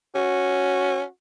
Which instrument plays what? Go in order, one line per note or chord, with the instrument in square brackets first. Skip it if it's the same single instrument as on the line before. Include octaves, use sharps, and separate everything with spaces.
[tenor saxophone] C#4 [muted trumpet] F#4